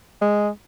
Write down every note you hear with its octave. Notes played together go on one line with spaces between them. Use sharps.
G#3